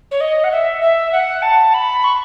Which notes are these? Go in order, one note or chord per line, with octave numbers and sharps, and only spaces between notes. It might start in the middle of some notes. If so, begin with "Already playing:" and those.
C#5
D#5
F#5
E5
E5
F#5
A5
B5
C#6